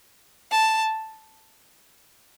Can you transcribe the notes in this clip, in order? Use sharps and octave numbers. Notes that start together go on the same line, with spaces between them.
A5